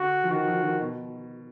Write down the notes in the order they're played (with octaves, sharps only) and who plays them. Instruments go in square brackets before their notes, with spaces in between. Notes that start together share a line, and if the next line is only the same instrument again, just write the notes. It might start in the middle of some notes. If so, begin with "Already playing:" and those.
Already playing: [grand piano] D3 [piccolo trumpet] F#4
[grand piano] F3
[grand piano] D#3 [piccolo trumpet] F#4
[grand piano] F3
D#3
B2